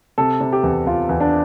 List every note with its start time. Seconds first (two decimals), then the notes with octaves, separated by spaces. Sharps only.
0.18 C3 A4
0.41 C3
0.52 G4
0.63 E2
0.86 E2 F4
1.09 E2
1.20 D4